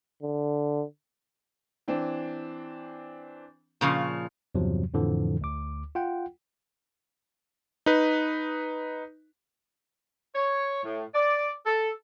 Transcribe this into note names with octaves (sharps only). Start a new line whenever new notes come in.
D3
E3 C4 D4
A#2 C#3 F3 C#6 D#6 F6
E2 G2 C3 F3 F#3
F2 A2 D3 E3 F3
D2 D6
F4 F#5 G5
D#4 B4
C#5
A2
D5
A4